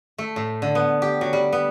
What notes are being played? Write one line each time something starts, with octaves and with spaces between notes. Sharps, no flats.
A3
A2
D3
B3
G4
F#3
G3
B3